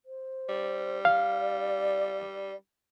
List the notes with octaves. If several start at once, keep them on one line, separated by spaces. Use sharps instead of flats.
C5
G3
D5 F5